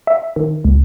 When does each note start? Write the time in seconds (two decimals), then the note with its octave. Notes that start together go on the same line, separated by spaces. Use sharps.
0.07 E5
0.36 D#3
0.65 C#2